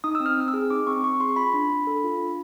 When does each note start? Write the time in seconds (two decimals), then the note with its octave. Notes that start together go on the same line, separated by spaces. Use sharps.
0.04 D#4 D#6
0.15 E6
0.20 C4
0.26 F6
0.37 C4 F6
0.48 E6
0.54 G#4
0.70 D#4 D6
0.87 C4 C#6
1.04 C4 C#6
1.20 G#4 C6
1.36 F4 B5
1.54 D4
1.70 D4
1.87 A4
2.04 F4
2.20 D4